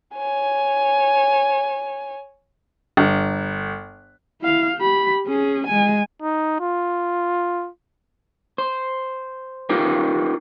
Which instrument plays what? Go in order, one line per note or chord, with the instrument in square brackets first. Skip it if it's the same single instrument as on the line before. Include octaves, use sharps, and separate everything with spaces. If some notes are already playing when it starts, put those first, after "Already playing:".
[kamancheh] C#5 G#5
[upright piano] G1
[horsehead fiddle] E4 F5
G4 B5
C#4 G#4
G#3 G#5
[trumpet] D#4
F4
[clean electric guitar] C5
D#4 F4 G4 A#4 B4